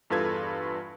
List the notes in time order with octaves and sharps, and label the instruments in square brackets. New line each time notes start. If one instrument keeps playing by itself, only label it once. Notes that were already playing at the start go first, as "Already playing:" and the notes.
[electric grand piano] E2 G2 F4 A4 B4 G#6